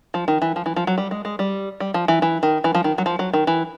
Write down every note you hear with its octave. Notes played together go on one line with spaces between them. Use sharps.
F3
D#3
E3
F3
E3
F3
F#3
G3
G#3
G#3
G3
G3
F3
E3
E3
D#3
E3
F3
D#3
F#3
F3
F#3
D#3
E3